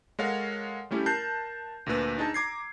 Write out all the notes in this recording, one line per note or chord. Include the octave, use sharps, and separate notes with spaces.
G#3 A4 A#4 C#5 F5 F#5
G3 A3 C#4 E4 G4
A#4 A5 F#6 G6 C7
D2 A#2 D4 B4 E6
D4 D#4 G#4 A5
A#5 D6 G#6 C7